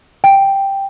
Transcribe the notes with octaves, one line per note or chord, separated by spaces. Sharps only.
G5